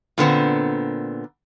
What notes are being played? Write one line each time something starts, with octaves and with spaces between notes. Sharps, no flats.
A#2 D3 B3 C4